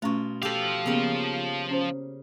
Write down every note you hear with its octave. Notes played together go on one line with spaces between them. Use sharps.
B2 A3 C#4 F4 C#6
F3 G4 A4 F5
C#3 A#3 B3 A#4
C#4 C5